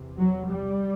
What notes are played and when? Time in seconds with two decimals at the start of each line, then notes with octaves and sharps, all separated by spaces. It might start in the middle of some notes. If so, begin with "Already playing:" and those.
Already playing: E2 C3
0.18 F#3
0.49 G3